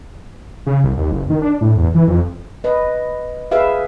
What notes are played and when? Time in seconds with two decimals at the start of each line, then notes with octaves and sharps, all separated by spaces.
0.66 C#3
0.84 C2
0.97 D#2
1.12 F#1
1.30 D#3
1.42 D4
1.61 A2
1.76 E2
1.95 E3
2.08 F2
2.64 B4 D#5
3.51 G#4 B4 E5 F5